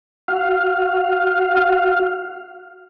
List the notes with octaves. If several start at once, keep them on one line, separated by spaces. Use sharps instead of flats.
F#4 F5